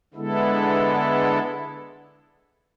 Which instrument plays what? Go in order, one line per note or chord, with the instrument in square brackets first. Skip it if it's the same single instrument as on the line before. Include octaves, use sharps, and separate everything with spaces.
[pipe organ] D3 G#3 B3 E4 A4